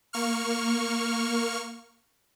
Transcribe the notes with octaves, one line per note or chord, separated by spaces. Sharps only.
A#3 C#6 F6